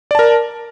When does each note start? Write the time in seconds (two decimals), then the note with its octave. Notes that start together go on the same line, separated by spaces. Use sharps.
0.11 D5
0.15 A5
0.19 A#4